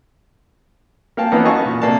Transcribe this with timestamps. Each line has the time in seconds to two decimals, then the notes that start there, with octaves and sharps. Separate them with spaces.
1.17 A#3 F5 G5 A5
1.32 E3 F3 A#3 B3 C#4 D#4
1.45 F#4 D#5 F5 G#5 A5 C#6
1.65 A#2
1.82 C3 A#3 D4 A5